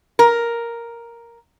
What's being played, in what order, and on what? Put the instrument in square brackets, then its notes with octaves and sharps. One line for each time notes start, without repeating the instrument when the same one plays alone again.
[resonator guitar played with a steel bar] A#4